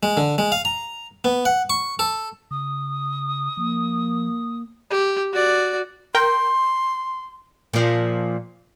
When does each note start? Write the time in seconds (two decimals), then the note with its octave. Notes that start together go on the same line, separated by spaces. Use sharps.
0.03 G#3
0.17 D3
0.38 G#3
0.52 F5
0.65 A#5
1.24 B3
1.45 F#5
1.70 C#6
1.99 A4
2.51 C#3 D#6
3.57 F3 A#3
4.90 G4
5.33 F#4 D5
6.15 A#4 G5 C6
7.73 A#2 F3